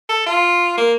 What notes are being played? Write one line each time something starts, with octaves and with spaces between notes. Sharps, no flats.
A4
F4
A#3